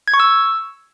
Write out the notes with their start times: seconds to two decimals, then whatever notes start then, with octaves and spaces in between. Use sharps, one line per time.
0.08 G#6
0.14 C#6
0.20 E6